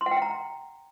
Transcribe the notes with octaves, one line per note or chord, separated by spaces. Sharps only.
C6
F#5
G5
F#5
A#5